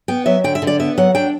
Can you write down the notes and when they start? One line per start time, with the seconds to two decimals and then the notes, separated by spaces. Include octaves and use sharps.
0.08 B3 G5
0.26 F#3 E5
0.44 D3 G5
0.55 E5
0.62 D3
0.67 D5
0.80 B3 E5
0.98 F#3 F#5
1.15 D4 G5